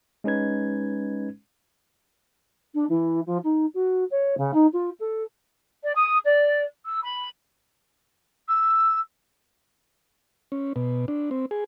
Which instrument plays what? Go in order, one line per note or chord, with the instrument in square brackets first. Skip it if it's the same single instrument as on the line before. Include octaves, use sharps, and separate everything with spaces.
[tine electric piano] G#3 C#4 D#4 B4 G#6
[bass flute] D4
E3
F3
D#4
F#4
C#5
C#3
D#4
F4
A4
[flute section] D5
D#6
D5
E6
B5
[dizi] E6
[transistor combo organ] C#4
B2
D4
C4
G#4